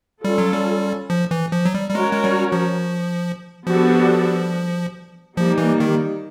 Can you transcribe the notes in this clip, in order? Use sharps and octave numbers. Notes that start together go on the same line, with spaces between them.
G3 C#4 F4 A4
F#3
G3
F3
E3
F3
F#3
G3
G3
G#3 C#4 F#4 A#4 C#5
G#3
G3
F3
F3 G3 B3 D4 F#4 A4
F3 G3 A#3 D#4
E3
D#3